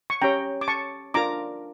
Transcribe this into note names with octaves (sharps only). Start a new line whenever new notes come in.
C#6
C#4 G4 C#5 G5 A#5
D6
A5 C#6
D4 F4 A#4 A#5 D6